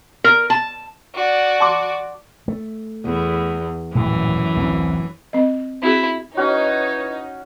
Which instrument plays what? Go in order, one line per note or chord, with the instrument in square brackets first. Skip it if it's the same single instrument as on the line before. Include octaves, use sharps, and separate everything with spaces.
[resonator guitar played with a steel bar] A#4
A5
[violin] F#4 D5
[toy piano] A5 C6 D6
[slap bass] A3
[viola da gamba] E2
[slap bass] D#1 A2 G3 [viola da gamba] F#2 E3
[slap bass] A1 D2 C4
[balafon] C4 D#5
[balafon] C4 F#4 G#4 [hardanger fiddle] E4
[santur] C#4 F#4 [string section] D#4 [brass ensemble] E4 B4 C#5